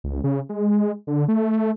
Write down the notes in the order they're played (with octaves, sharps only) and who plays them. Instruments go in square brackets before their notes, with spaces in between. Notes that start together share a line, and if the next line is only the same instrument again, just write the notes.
[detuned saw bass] C#2
C#3
G#3
D3
A3